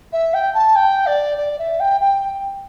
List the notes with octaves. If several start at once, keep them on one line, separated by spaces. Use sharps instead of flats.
E5
G5
A5
G5
D5
D5
E5
G5
G5